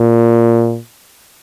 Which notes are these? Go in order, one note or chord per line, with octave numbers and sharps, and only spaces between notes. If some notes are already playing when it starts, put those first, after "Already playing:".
Already playing: A#2